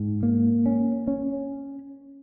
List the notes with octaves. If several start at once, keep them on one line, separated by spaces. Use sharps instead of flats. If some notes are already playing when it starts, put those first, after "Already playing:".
Already playing: G#2
A#3
C#4
C#4